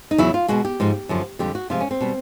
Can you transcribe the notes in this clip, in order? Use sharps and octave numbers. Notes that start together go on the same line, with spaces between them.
D#4
E2 C#3 F#3 E4
F4
B2 G#3 F#4
G4
G#2 F3 G#3
F#2 D3 F3
F2 D3 G3 G4
F#4
C3 F3 G#3 F4
C#4
C4
B2 G3